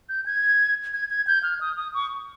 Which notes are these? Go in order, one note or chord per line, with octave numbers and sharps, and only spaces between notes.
G6
G#6
G#6
G#6
G6
F6
D#6
D#6
C#6